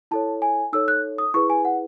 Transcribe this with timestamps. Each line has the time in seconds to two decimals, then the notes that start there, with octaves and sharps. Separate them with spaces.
0.11 E4 A4 C#5 A5
0.42 G#5
0.73 D#4 A4 C#5 E6
0.88 F#6
1.18 D#6
1.34 E4 G#4 B4 C#6
1.50 G#5
1.65 F#5